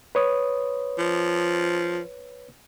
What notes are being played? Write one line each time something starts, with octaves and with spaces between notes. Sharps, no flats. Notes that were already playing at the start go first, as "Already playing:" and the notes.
B4 C#5 D#6
F3